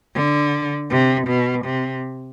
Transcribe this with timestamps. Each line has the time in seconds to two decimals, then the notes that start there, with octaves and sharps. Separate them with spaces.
0.15 D3
0.90 C3
1.28 B2
1.66 C3